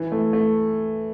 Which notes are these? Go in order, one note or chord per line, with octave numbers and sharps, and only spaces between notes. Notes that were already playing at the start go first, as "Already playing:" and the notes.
Already playing: E3
A3
A3